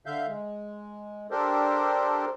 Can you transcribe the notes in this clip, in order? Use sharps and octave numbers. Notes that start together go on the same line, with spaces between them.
D3 E5 F5 G6
G#3
D4 G4 A4 A#4 C5